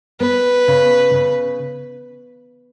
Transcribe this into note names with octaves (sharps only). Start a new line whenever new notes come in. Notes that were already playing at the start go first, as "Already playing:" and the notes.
B3 B4
C#3
C#3